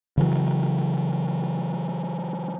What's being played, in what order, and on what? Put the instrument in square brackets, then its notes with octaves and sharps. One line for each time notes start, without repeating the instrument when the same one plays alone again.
[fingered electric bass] C#3 E3 F#3